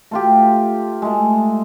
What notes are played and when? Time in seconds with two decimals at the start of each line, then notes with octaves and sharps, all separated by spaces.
0.11 A3 F4 G4
1.02 G#3 A3